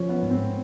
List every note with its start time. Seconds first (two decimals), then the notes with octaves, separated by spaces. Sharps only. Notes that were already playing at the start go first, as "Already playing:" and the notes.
Already playing: F3 C#4
0.09 B3
0.23 G#2
0.30 C4